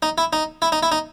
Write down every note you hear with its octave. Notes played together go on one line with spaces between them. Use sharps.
D#4
E4
D#4
E4
D#4
E4
D#4